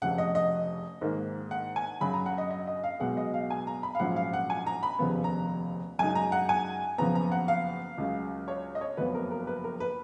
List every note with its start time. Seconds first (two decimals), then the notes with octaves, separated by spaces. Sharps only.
0.02 F1 F2 C#3 F#5
0.18 D#5
0.35 D#5
1.01 G#2 D#3 A#3
1.51 F#5
1.76 G#5
2.01 F#2 C#3 F#3 B5
2.13 A#5
2.26 F#5
2.38 D#5
2.51 D#5
2.67 D#5
2.84 F5
3.00 B1 B2 G#3 F#5
3.17 D#5
3.34 F5
3.50 G#5
3.67 A#5
3.83 B5
3.95 F5
3.99 A#1 G#2 F#3 C#4 F4 F#5
4.16 F5
4.33 F#5
4.50 G#5
4.67 A#5
4.83 B5
4.99 F1 D#2 C#3 F3 B3
5.24 A#5
5.99 F#2 C#3 G#3 D#4 G#5
6.15 A#5
6.32 F#5
6.49 G#5
6.98 F#1 F2 C#3 F3 B3 A#5
7.15 A#5
7.32 F#5
7.48 F5
7.98 C#2 C#3 F#3
8.48 C#5
8.75 D#5
8.81 C#5
8.97 F#1 F2 F3 B3 B4
9.15 A#4
9.31 A#4
9.47 B4
9.64 A#4
9.80 B4